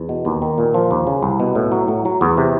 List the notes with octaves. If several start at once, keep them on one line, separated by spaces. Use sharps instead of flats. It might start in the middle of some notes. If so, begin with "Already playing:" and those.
Already playing: E2
B2
D#2
D#3
A#2
F3
D#2
C#3
C2
B2
A2
F#3
A2
F#3
E2
C3